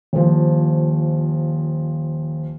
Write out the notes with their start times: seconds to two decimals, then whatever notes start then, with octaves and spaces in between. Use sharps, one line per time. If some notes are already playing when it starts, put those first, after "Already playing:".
0.13 D#1 F3